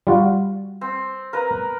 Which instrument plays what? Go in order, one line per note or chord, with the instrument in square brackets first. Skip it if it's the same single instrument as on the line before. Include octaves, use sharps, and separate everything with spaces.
[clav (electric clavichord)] G3 F4 F#4
[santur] C4
A#4 B4 A#5